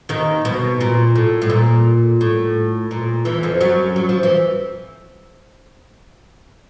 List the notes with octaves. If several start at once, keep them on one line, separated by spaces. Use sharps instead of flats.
D#2 D#3
B2
A#2
A2
A2
A#2
A2
A#2
E2 E3
F2 F3
F#2 F#3
F#3
F3
E3